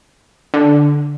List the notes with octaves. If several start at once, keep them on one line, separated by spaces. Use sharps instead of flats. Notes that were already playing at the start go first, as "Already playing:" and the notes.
D3